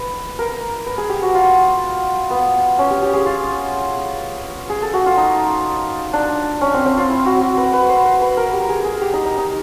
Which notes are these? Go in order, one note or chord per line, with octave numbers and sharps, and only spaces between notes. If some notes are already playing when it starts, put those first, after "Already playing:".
Already playing: B4
A#4
B4
G#4
G4
F#4
F4
B3
C#4
G4
G4
G#4
F4
G#4
A4
F#4
F4
D#4
D4
C#4
C4
C4
F4
E4
F#4
F#4
B4
B4
C5
B4
B4
A#4
G4
G#4
G#4
G4
D#4
D#4
D#4